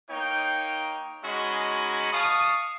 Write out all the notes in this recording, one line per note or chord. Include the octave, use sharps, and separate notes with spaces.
A#3 D#4 C#5 G5
G#3 C#4 D#4 F#4 D#5 B5
F5 A5 C#6 D#6